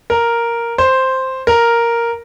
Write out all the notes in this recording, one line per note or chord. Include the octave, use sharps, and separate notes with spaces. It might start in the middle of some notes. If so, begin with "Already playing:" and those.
A#4
C5
A#4